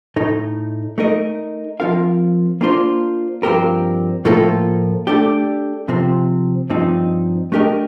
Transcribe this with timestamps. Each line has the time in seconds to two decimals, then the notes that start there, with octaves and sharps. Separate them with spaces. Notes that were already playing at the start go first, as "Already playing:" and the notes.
0.16 A2 A3 D#4
0.98 A3 D#4 A#4 D#5
1.80 F3 C4 F4 A#4 F5
2.61 A#3 D4 F4 C5
3.43 G2 F3 C4 G4 A#4
4.25 A2 F3 A#3 F4 A4
5.07 A3 D4 G4
5.88 C3 F3 C4
6.70 G2 F3 C4 D#4
7.52 A3 D4 G4 A#4 D#5